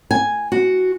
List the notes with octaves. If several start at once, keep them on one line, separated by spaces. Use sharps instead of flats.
G#5
F#4